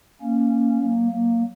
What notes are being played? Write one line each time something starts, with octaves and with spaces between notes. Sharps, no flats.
A#3 C#4
F#3 A#3
F#3 A#3